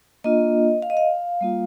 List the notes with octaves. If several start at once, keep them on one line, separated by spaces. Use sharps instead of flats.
A#3 D4 F4 D#5
F5
D#5
F5
G3 A#3 F4